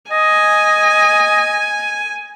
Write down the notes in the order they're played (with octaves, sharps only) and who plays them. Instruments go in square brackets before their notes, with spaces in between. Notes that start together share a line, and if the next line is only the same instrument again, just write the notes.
[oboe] D#5 [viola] G#5